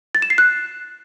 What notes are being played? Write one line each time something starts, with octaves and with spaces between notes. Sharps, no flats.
A6
E7
C7
F#6